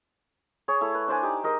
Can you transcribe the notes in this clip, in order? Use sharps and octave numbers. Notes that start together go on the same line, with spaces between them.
G#4 C#5
A3 E4
B4
D4 C5 D5 G#5
D#4 G4
G#3 A#4 D#5